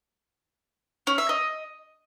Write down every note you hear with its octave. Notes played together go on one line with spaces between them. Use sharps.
C#4
E5
D#5